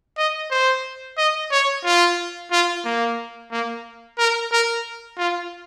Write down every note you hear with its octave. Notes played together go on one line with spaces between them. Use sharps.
D#5
C5
D#5
C#5
F4
F4
A#3
A#3
A#4
A#4
F4